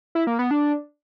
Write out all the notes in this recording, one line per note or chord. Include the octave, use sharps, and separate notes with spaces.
E4
A#3
B3
D4